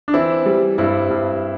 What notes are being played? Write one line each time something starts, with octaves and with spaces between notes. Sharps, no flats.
D4
E3 C4 E4
G3
G2 C4 E4
G2